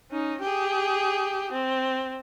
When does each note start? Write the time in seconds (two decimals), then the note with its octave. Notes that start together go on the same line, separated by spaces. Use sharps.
0.12 C#4 D#4
0.42 G4 G#4
1.52 C4